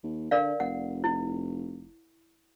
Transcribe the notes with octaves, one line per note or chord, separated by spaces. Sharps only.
D#2
D3 A#4 D5 F5
F1 F#5
E4